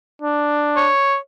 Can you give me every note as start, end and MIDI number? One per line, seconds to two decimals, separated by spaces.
0.22 0.91 62
0.76 1.16 73